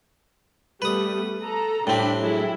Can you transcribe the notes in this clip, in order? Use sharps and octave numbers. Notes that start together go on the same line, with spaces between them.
G3 A3 B3 B4 D#6
A4 A#5
A2 G3 C4 D4 B5
F#3 G#3 E4